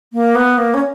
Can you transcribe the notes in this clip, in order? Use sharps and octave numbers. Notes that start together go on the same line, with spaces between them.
A#3
B3
A#3
C#4